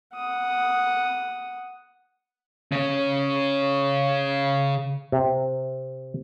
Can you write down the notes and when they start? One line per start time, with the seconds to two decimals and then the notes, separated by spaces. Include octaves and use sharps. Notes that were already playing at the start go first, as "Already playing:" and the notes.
0.15 F#5 D#6
2.72 C#3 C#4
5.12 C3